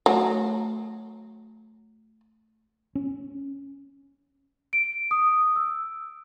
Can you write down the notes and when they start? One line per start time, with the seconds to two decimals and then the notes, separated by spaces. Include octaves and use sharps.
0.06 F#3 A3 C#5
2.95 C#4
4.73 D7
5.11 D#6
5.56 E6